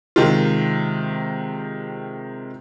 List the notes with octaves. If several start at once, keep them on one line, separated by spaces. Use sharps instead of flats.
C3 D#3 G#3 F4